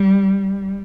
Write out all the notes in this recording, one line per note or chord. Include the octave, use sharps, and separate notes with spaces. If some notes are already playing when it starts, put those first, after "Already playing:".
Already playing: G3